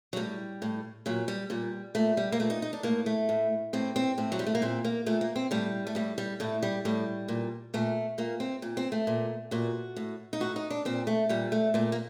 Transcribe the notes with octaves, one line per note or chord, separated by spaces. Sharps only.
F#3
A2 G3
A2
A#2 F#3
G3
A#2 G3
A#2 A3
G3
A#3
A#2 A3
D#4
D#4
D4
A2 A#3
A3
A2
A2 C4
C4
A2 C4
F#3
G3
A3
A#3
A#2 C4
A#3
A#2 A3
A#3
C4
A2 G3
A3
A2 G3
G3
A2 A3
G3
A2 G3
A#2
A#2 A3
A#2 A#3
C4
A#2
C4
A3
A#2
A#2 F#4
A2
D#4
A2 F#4
D#4
D4
A#2 C4
A3
A#2 G3
A3
A#2 A3
A#3